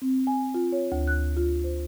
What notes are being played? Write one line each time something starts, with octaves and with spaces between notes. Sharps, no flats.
C4
G#5
F4
C#5
D2
F#6
F4
C5